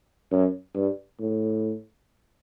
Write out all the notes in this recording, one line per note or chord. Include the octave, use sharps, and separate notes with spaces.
F#2
G2
A2